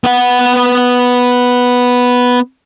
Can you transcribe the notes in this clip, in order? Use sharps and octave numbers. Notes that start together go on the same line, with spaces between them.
B3 F#5